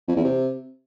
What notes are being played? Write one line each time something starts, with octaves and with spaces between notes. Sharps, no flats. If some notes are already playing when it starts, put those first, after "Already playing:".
F2
E2
C3